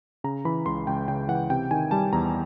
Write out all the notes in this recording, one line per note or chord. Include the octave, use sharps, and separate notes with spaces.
C#3 A#5
E3 B5
C#2 C6
C#2 G5
C#3 G5
E3 F#5
C3 G5
D#3 G#5
G3 A5
E2 A#5